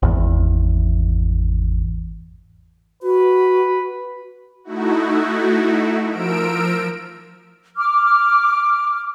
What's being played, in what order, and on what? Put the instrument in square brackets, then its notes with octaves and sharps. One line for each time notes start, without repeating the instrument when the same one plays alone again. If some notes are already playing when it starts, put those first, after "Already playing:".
[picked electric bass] G#1 E2
[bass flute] F#4 [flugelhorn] B4
[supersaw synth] A3 D#4 E4 F#4
F3 A#4 E6 D7
[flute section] D6 F6